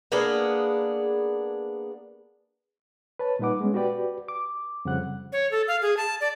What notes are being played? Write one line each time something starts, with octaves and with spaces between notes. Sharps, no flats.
A#3 B3 D4 G#4
B4 C#5 A5
A#2 G3 D#4 B4 F#5 D6
G#3 B3 C#4
F#4 G4 B4 D5 G5
D6
F2 C#3 G3 C4 F#5 F#6
C#5
A4
F5
G#4
A5
D5